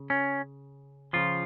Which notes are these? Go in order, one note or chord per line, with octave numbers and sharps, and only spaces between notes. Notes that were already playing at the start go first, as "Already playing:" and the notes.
Already playing: C#3
C#4
C#3 F3 F4